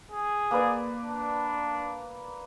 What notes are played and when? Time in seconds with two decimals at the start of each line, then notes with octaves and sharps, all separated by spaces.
0.11 G#4
0.51 A#3 B4 D5
1.03 D4